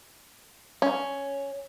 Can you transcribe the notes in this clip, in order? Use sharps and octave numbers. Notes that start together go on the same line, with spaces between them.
C#4